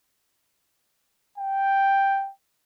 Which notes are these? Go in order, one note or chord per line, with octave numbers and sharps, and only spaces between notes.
G5